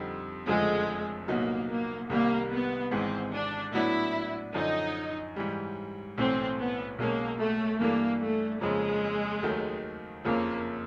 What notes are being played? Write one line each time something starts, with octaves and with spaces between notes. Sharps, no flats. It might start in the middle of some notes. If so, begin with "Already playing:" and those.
Already playing: F2 D3 G3 C4 D#4
F#1 F2 D3 F3 G#3 A3
C2 A#2 F#3 A#3 B3 D#4
A#3
C2 C3 D#3 G3 A#3
B3
G#1 G#2 E3 G#3 C4
D4
A2 F#3 B3 D4 E4
F#2 D3 F3 D#4
G#2 E3 G3
B1 A2 E3 A3 C4
B3
B1 B2 G#3 A#3 C#4
A3
G2 E3 A3 A#3 D4
A3
F2 C#3 F3 G#3 A#3
D#2 D#3 F#3 A3
F#1 F2 C#3 F3 A#3